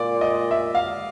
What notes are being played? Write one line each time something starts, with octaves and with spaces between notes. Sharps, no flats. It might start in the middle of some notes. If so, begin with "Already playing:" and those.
Already playing: A#2 D5
D#5
E5
F5